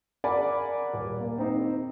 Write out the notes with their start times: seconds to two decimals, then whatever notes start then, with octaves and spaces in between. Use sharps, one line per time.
0.24 A#4 D5 F#5 G#5 B5
0.93 D#1
1.20 A#3
1.38 C4 D#4 C5